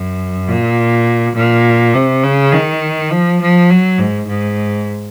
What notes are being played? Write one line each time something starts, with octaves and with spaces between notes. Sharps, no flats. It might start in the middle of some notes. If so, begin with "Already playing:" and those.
Already playing: F#2
A#2
A#2
C3
C#3
D#3
F3
F3
F#3
G#2
G#2